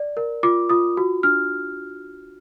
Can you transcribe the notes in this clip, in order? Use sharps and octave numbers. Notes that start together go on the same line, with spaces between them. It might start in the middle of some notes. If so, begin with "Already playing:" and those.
Already playing: D5
A#4
F4 D6
F4 D#6
F#4
D4 F6